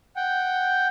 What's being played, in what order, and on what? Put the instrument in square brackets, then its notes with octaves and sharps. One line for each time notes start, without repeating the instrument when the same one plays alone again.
[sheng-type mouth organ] F#5 G5